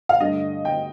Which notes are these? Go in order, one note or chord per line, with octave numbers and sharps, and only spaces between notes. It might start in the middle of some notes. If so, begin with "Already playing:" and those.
F5
G2 D3 A3 D#5
G5